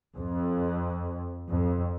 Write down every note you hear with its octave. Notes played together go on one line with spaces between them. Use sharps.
F2
F2